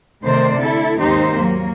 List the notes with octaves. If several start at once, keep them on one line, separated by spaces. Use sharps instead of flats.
C3 D#3 A3 C4 C5 D5
D3 E4 A4
D#2 G#2 C4 D#4 G4 C5
F#3 A#3